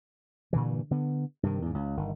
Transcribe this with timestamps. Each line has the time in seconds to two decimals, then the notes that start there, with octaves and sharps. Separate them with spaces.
0.53 G2 A#2 D3 E3
0.91 D3 B3
1.43 G2 C3 D#3
1.62 E2 G#2
1.74 C#2
1.97 G1 D#3